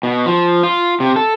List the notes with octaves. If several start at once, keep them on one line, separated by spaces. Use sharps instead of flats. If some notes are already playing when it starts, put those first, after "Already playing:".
B2
F3
F4
C3
A4